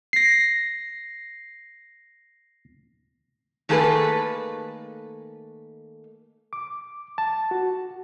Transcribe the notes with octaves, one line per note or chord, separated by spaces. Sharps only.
A#6 C7
D#3 A3 A#3 G#4 A4 B4
D6
A5
F#4